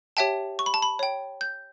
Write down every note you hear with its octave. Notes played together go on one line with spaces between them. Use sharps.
G4 C#5 E5 G5 A5
C#6
B5
A5
B5
C#5 G5
G6